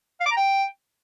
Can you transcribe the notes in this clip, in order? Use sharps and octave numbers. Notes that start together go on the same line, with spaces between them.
F5
D6
A#5
G5